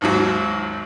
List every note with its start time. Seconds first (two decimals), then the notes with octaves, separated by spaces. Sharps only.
0.01 G#1 D#2 G#2 F#3